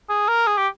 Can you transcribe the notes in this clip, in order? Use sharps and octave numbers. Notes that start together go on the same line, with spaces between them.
G#4
A#4
G#4
G4